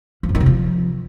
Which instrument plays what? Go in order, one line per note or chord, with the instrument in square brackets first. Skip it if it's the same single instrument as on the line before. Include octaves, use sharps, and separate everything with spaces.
[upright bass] F3
F#2
D#3
C3
F3